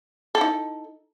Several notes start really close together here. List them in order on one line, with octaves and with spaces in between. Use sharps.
A4 E4 D#4